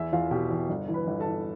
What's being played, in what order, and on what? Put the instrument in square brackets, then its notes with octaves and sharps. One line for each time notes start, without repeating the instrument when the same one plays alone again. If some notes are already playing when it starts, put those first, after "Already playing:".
Already playing: [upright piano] E2 E4 E5
E2 F4 F5
B2 G4 G5
E2
G1
E3
B4 B5
G1
A4 A5
E3